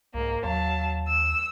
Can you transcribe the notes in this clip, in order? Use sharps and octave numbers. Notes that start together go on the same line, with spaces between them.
C2 G#2 A#3
D#2 F#3 F5 A5
E6